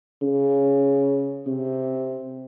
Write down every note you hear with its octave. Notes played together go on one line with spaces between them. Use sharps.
C#3
C3